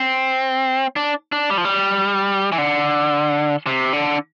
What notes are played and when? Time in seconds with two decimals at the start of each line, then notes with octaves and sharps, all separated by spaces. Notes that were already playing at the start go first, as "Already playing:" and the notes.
Already playing: C4
0.96 D4
1.32 D4
1.50 G3
1.58 F3
1.65 G3
2.52 E3
2.58 D3
3.66 C3
3.93 D3